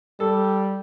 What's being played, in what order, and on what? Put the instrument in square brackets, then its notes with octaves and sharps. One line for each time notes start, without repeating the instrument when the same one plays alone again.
[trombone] G3 [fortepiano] A4